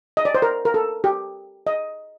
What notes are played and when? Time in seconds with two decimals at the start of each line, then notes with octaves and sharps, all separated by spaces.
0.17 D#5
0.25 D5
0.35 C5
0.42 A#4
0.65 A#4
0.74 A4
1.04 G4
1.67 D#5